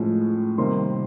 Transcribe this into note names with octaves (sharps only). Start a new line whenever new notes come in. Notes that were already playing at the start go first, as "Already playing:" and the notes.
Already playing: A2 F3 G#3 C#4
C3 D#3 G3 A#3 C6